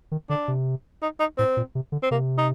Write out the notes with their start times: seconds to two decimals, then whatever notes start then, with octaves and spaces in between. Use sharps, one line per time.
0.12 D#3
0.29 D3 D4
0.48 C3
1.02 D#4
1.20 D#4
1.38 A2 C4
1.57 A#2
1.75 C3
1.92 D3
2.03 C4
2.11 C3 A#3
2.38 D#4